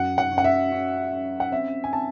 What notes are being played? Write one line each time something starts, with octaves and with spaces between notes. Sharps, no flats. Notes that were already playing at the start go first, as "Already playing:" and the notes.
Already playing: F#2 F#5
F#5
C#4
F#5
E5
C#4
C#4
F#5
C4 E5
G#5
C4 A5